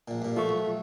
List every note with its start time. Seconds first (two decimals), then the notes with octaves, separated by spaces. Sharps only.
0.08 A#1 A#2
0.22 G2 A#2
0.37 F3 A3 F4 C#6
0.49 B1